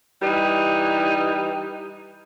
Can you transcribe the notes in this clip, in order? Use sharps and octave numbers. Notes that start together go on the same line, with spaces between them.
E3 G3 D#4